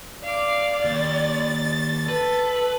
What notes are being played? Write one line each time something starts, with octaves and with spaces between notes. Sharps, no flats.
D5 F5 D6
D#2 A6
A4 B4